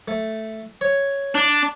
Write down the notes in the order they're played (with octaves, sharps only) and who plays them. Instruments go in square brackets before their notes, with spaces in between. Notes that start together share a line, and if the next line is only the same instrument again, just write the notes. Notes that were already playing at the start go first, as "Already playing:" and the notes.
[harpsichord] A3
C#5
[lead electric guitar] D4